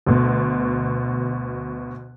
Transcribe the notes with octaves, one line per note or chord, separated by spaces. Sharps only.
D2 B2